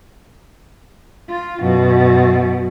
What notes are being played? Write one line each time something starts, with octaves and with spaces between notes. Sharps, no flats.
F4
F#2 B2